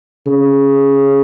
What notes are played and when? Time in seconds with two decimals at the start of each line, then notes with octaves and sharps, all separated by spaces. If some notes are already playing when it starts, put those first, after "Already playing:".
0.27 C#3